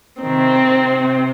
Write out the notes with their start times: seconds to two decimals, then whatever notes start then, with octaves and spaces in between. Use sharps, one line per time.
0.21 C3 D#3 C4
0.71 C3